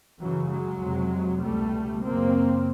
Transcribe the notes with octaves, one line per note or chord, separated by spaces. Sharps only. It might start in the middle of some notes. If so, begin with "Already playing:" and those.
F#2 C#3 E3 F#3
F#3 G#3
F2 C3
C#2 B2 G3 A3
F#2 C#3 A#3 C4